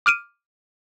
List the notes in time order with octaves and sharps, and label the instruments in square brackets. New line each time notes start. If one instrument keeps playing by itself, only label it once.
[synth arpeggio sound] D6 F6 D7 D#7